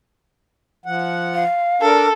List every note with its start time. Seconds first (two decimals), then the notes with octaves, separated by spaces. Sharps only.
0.86 F3 F#5
1.34 F5
1.82 D4 A4 A#4